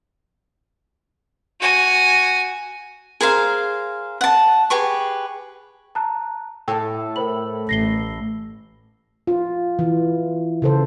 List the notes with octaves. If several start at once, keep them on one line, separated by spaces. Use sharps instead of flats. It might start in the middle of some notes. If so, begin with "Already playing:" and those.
F#4 G#5
G#4 A#4 C5 F5
F#5 A5
G4 G#4 B4 C#6
A5 A#5 F#6
A2 A4 G5 A5
A#4 C5 B5 F#7
A1 A#6 C7 G7
F4
E3
C#3 A4 C5